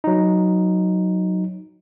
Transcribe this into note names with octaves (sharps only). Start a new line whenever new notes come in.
F#3 D#4